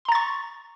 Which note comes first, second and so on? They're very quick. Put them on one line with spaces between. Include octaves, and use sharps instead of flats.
C6 A#5 A6 C#6